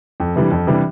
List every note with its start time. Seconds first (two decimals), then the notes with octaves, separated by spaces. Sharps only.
0.20 F2
0.36 C3 E3 G3 D4
0.51 F2
0.67 C3 E3 G3 D4